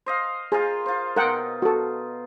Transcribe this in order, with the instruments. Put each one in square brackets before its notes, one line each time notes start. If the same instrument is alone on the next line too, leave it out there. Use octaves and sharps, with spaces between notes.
[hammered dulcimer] C5 D#5 F5
[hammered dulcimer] F4 A#4 C5 [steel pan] G#4
[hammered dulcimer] F4 C5
[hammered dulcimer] B2 D#4 [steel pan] A#4 F#5 G5
[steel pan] F#4 A4